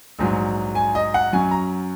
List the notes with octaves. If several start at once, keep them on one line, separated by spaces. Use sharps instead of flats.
A#1 G#2 F#3
G#5
D#5
F#5
F#2 F#3 C#4 G#5
A#5